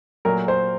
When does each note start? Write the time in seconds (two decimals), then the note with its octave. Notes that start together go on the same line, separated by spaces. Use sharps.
0.25 A#2 F#3 A3 A#4
0.48 C5